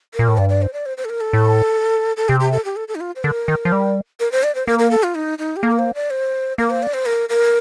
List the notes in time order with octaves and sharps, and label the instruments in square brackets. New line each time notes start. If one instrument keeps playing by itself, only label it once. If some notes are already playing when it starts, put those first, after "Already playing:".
[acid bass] A#2 [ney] A#4
[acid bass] A2
[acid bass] G2 [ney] D5
[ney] D5
C5
D5
C5
C5
A4
A#4
A4
[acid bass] A2
[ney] A4
[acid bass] C3 [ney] G4
[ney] G4
A4
G4
A4
A4
D#4
F4
C5
[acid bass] D3 [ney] A#4
[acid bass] D#3
F3
G3
[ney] A#4
C5
D5
C5
[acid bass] A#3 [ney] A#4
[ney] A#4
A4
F4
D#4
D#4
G4
[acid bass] A#3 [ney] A4
[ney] A#4
C5
D5
C5
[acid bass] A#3 [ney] A#4
[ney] C5
D5
C5
A#4
A#4